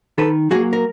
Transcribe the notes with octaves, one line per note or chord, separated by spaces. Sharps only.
D#3 A4 B4
F#3 A#3 F#4 G#4
A#4